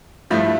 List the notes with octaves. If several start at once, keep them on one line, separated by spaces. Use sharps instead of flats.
G2 F3 A3 E4